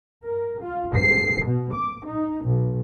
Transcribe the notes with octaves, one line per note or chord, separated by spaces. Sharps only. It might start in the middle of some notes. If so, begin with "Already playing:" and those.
A#4
F4
C7
B2
D6
D#4
B1